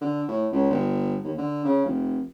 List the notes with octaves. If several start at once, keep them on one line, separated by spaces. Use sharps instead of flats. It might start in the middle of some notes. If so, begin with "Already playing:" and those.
D3
A2
C#2
G1
D#2
D3
C#3
F1